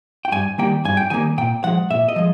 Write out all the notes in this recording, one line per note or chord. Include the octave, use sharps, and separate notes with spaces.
G5
G2 G#5
D#3 G3 A#3 G5
G2 G#5
G5
D#3 G3 A#3 G#5
A#2 G5
F3 G#3 F#5
A#2 E5
D#5
F3 G#3